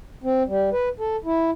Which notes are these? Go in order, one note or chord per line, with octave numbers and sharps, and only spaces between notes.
C4
G3
B4
A4
E4